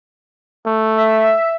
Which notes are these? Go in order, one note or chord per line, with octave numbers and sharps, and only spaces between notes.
A3
E5